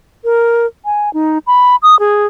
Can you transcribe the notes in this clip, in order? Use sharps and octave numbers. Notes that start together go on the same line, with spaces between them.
A#4
G#5
D#4
B5
D#6
G#4